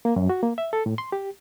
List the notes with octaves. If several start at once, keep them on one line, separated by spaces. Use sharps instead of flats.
A#3
F#2
F#4
A#3
E5
A4
A2
C6
G4